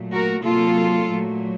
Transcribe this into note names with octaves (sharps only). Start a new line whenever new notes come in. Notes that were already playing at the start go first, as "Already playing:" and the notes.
Already playing: A#2 F#3 A3
F#4 A#4
C3 F#3 A#3 F4 A4
A#2 F#3 A3